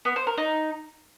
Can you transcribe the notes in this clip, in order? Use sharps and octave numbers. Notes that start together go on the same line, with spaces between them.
B3
C5
A#4
D#4